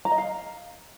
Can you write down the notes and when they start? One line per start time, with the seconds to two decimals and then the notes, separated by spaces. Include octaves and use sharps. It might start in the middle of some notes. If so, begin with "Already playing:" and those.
0.05 A#5
0.12 D#5
0.18 F5